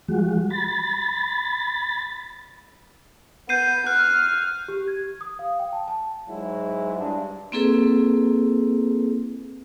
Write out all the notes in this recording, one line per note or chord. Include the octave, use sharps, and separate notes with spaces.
F3 G3 G#3 F#4
B5 A6
B3 G6 C7 D#7
F6 F#6
G4
G#6
D#6
F5
G5
A5
A5
G#2 F#3 G#3 E4
G2 D4
A#3 C4 E4 G#4 A4 B4